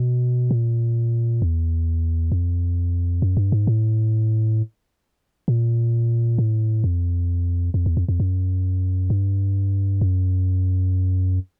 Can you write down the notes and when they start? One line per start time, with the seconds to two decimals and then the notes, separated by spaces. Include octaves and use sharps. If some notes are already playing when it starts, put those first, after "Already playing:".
Already playing: B2
0.51 A#2
1.42 E2
2.32 F2
3.22 F#2
3.37 G2
3.52 G#2
3.67 A2
5.48 A#2
6.38 A2
6.84 F2
7.74 F2
7.86 E2
7.97 F2
8.09 F2
8.20 F#2
9.10 G2
10.01 F#2